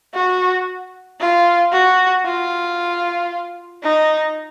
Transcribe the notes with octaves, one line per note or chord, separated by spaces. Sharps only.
F#4
F4
F#4
F4
D#4